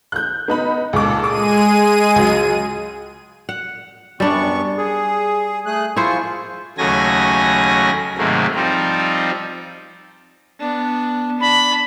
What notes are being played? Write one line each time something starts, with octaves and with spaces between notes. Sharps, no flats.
F#6 G6
B3 D#4 B5
C#2 A#2 A4 D6
G#3 G#4 D6 D#7
C#2 F#3
F#5
F#2 G3 B3 D4 C#6
G#4
A3 G#4 F#6
F3 E4 F4 G#4 C5 C#6
D#2 C#3 F#3 A3 G#5 A#6
G#2 C3 D#3 F#3 A3 A#3
F3 G3 C4 D#4
B3 D4
D4 B5